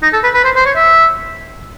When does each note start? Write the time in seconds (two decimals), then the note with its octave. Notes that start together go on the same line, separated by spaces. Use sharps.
0.03 D#4
0.13 A4
0.23 B4
0.34 B4
0.45 C5
0.56 C5
0.65 C#5
0.76 E5